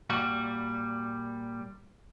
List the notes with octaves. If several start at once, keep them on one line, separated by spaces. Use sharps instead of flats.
A#2 G3 F#4